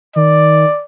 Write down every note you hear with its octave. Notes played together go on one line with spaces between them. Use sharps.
D#3 D5